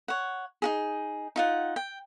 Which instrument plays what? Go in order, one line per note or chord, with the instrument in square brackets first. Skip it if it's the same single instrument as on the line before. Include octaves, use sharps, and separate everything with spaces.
[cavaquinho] C#5 F#5
D#4 F#4 G#4
D#4 F4 F#5
G5